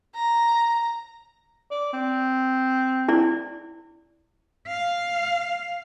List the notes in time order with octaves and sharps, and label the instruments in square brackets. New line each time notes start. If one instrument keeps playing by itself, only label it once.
[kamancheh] A#5
[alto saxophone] D5
C4
[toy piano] E4 D5
[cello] F5